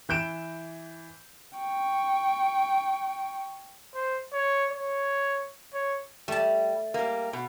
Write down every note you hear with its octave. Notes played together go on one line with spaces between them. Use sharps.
E3 G6 D7 E7
G5 C#6
C5
C#5
C#5
C#5
G3 A3 A5
G3 A#3
B2